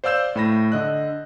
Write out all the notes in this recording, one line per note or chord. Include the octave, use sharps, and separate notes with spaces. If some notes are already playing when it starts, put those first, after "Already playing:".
C5 D5 F5 E6 G6 E7
A2 B5 A#6
D3 D#5 F#6